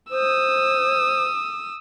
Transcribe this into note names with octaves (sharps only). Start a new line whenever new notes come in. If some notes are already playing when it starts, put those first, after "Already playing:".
C5 D#6 E6